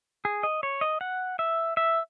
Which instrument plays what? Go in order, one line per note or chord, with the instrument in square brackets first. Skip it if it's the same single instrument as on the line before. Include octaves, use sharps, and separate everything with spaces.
[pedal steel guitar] G#4
D#5
C#5
D#5
F#5
E5
E5